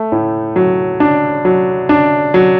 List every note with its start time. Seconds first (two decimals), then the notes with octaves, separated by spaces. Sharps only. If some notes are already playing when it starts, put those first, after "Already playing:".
Already playing: A3
0.12 A2
0.56 F#3
1.00 D4
1.45 F#3
1.89 D4
2.34 F#3